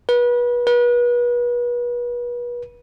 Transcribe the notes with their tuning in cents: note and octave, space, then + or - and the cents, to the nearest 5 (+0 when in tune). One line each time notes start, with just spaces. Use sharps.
B4 -30
B4 -35